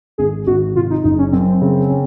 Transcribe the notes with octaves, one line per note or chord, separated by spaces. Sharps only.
G#1 G#4
G#1 F#4
C3 F4
D#4
F#1 D#4
C#4
F#2 C4
C#3
C#4